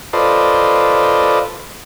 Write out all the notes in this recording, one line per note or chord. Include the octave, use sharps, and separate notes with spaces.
F4 A4 B4 C5 D5 D#5